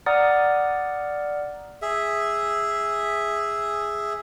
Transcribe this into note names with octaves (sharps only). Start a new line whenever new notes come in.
D5 F#5 A#5 D#6 F6 A6
G#4 E5